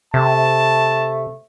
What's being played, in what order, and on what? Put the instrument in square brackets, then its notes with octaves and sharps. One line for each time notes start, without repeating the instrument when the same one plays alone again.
[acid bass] C3 [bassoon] A3 [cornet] A5